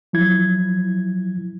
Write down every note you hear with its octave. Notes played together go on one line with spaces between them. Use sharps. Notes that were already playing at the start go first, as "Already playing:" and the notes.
F3 F#3 E4 G#6